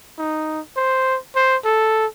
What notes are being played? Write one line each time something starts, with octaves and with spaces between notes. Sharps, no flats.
D#4
C5
C5
A4